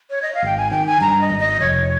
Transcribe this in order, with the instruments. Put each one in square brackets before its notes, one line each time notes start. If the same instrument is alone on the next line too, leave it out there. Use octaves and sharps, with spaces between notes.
[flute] C#5
D#5
F5
[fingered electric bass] G#1 [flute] G5
[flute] G#5
[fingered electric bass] D#3 [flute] G5
[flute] G#5
[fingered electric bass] G2 [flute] A#5
[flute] D#5
[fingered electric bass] G#1
[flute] D#5
[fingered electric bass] F1 [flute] C#5